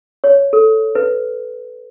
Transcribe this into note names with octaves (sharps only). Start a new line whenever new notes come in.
C#5
A4
B4